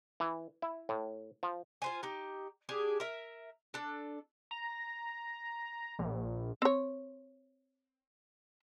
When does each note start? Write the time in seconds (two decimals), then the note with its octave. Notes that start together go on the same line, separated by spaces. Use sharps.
0.20 E3
0.62 E4
0.89 A2
1.43 F3
1.82 F4 C5 G#5
2.03 D#4 G4
2.69 D4 G4 G#4
3.00 A#4 E5
3.74 D4 A4
4.51 A#5
5.99 A#1
6.62 C4 C#5